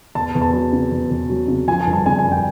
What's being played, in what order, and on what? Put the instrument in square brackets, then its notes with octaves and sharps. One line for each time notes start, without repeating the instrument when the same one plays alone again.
[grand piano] E2 A5
E2
A5
F#3
C#3
E2
E2
F#3
C#3
F3 G#5
A5
G1
A5
C#3 G#5
G#5
F#2
G5